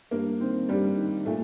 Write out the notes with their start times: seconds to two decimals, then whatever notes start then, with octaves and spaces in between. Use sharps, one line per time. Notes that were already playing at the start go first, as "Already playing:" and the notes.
0.11 G2 A#3
0.40 D#3 C4
0.69 G2 G3
0.97 D#3
1.26 A#2 A3